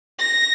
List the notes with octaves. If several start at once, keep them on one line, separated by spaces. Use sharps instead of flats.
A#6